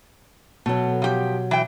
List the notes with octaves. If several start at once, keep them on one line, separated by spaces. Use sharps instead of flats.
B2 F#3 A3
F3 G4
E3 G5